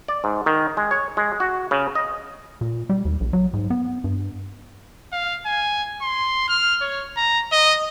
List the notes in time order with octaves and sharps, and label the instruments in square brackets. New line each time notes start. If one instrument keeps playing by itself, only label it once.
[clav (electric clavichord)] D5
G#2
D#3
G#3
C#5
G#3
F#4
C#3
D#5
[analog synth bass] A#2
G3
D#2
A#1
F#3
G#2
B3
G2
[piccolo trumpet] F5
G#5
C6
F6
C#5
A#5
D#5